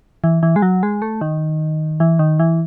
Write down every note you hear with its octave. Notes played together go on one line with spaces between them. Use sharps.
E3
E3
G#3
F#3
G#3
A3
D#3
E3
D#3
E3